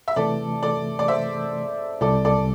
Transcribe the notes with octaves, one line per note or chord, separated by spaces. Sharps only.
E5
C3 E3 A3 A4 D5
A4 D5
D5
C5 E5
C2 C3 G3 A4 D5
A4 D5